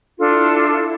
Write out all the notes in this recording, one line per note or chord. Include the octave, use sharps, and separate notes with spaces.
D4 E4 F4 A4